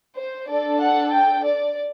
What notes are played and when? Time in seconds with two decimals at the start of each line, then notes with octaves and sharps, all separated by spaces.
0.17 C5
0.49 D4 A4 D5
0.80 F#5
1.13 G5
1.45 D5